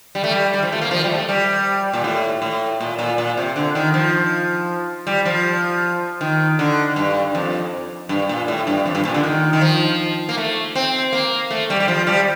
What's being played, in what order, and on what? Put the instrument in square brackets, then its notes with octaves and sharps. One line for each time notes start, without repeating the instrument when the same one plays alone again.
[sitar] G3
A3
G3
G3
F3
A3
A#3
F3
G3
A3
G3
A#2
A2
A2
A#2
A#2
A#2
C3
D3
D#3
F3
G3
F3
D#3
D3
G2
F2
G2
A#2
A2
G2
F2
G2
A#2
D3
D#3
D#3
F3
A#3
A3
C4
A#3
A3
G3
G3
F3
G3